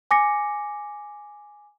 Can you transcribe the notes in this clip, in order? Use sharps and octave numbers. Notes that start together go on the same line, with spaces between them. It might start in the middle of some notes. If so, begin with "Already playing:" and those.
G#5 D6 A#6 C#7